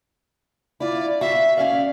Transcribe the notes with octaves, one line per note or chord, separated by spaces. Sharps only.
E4 F4 D5
F#4 E5 F5
C#4 D5 F5